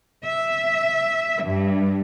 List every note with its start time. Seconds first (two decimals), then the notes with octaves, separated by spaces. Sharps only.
0.25 E5
1.43 G2